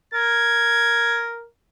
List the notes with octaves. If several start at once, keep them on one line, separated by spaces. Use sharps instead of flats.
A#4 G#6